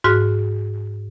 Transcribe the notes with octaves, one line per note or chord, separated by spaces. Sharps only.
G#2 F#4 F6